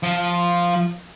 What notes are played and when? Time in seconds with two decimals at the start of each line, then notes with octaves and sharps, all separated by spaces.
0.03 F3